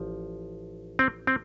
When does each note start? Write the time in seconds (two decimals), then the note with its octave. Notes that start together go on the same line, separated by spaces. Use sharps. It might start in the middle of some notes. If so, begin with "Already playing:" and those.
Already playing: A1 F3
0.99 C4
1.27 C4